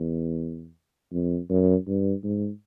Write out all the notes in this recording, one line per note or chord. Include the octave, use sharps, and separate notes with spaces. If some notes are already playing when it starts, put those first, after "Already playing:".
Already playing: E2
F2
F#2
G2
G#2